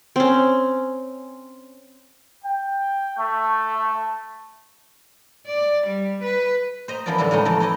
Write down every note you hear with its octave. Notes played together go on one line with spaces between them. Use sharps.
C4 C#4
G5
A3
D5
G3
B4
C5 D#5 G5 A#5
F#2 E3 F3 B3 F4 D5
A2 D3 E3 G3 D4 E5
A2 C#3 G#3 A3 D#4
F2 E3 A3 D5 A#5
D#4 E4 D5 D#5 A5